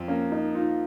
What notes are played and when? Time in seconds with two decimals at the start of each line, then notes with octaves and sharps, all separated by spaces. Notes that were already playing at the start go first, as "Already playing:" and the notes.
Already playing: F2
0.08 A#3 C#4
0.32 D#4
0.55 D#4 F4